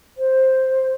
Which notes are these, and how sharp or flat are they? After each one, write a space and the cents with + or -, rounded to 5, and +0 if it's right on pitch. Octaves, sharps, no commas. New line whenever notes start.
C5 +5